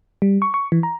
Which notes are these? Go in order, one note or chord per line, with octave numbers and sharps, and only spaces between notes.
G3
C#6
C#6
E3
A#5